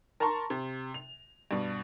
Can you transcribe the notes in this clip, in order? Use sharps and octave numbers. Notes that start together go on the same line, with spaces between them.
A#4 A5 A#5 C6 C#6
C3
F7
G2 B2